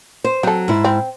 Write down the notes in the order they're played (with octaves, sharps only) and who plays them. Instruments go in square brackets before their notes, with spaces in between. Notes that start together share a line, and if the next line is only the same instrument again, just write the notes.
[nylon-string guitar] C5
[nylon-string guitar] F#3 [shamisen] C4 A4
[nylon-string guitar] G#2 E4
[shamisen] C4